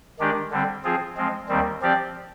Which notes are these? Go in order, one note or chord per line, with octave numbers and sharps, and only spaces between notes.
D#3 G#3 D4 G4
D3 G3 C4
F3 C4 F4 G#4
F3 G#3 C4
D#2 D#3 G3 C4
F3 C4 G4 D5